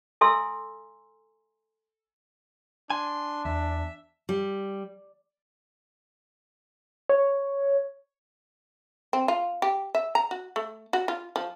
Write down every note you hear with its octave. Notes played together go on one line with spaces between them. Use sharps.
A4 E5 G#5 A#5 C6 E6
D4 G#5 C6
E2 E5
G3
C#5
C4
F4
G4
E5
A#5
F#4
A3
F#4
F4
F3